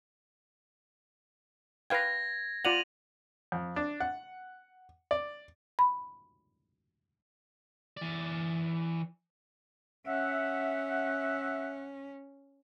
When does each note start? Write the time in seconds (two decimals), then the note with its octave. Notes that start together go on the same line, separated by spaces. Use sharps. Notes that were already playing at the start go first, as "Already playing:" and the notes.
1.90 B4 F5 G5 G#6 A#6
2.65 F4 D5 F#5 D#7 F7 F#7
3.52 F2
3.76 D4
4.00 F#5
5.11 D5
5.79 B5
7.97 E3 D5
10.07 C#4 E5 F#5